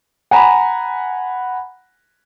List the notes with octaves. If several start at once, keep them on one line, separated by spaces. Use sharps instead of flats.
F#5 G#5 A#5 B5